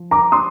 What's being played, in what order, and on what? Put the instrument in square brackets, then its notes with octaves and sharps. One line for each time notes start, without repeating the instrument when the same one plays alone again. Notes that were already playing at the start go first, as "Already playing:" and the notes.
Already playing: [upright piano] F3
A#5 D6
C6 D#6